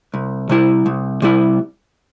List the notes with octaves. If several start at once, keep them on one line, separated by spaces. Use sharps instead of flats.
C2
C3 G3 E4
C2
C3 G3 E4